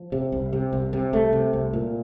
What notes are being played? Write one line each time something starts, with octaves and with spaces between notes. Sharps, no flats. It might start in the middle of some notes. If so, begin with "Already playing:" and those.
Already playing: F3
C3
C2
C3
C2
C3
C2 A3
C3
C2
A#2